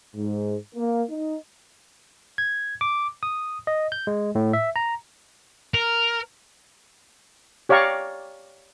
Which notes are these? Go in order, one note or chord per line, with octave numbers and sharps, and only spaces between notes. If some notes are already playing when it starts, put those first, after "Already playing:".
G#2
A#3
D#4
G#6
D6
D#6
D#5
G6
G#3
A2
E5
A#5
A#4
G4 C#5 D5 F5 A#5 C#6